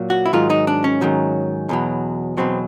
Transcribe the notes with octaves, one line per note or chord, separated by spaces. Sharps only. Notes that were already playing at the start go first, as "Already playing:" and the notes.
Already playing: A#2 F#3
F#4
E4
G#2 D#3 F#3 F4
D#4
D4
C#4
G#2 D#3 F#3
E2 B2 F#3
E2 B2 F#3 C4